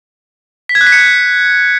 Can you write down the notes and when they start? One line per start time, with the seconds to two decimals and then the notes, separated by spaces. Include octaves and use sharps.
0.69 B6
0.75 G#6
0.81 F#6
0.87 B6
0.92 C#7